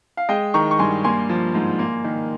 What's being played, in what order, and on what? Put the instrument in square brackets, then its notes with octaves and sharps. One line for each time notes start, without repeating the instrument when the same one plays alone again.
[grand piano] F5
G#3 D#5 G5
D#3 A#5 C#6
C#6
G2 G#5 C6
A#3 G#5 C6
F3
G#2
A#3
D#3